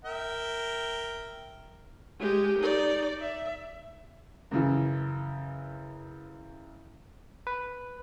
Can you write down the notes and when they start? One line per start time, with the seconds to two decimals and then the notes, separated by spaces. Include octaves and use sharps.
0.05 A#4 E5 G5
2.19 G#3 G4
2.59 D#4 D5
3.20 E5
4.51 F#2 C#3 E3
7.47 B4